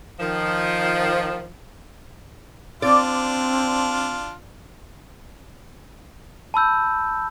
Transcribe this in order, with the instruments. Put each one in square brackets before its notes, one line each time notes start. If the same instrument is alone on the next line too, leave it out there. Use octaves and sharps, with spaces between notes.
[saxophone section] D#3 F3
[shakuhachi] C4 [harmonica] D4 F4 [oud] D5
[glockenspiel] A5 B5 E6 G6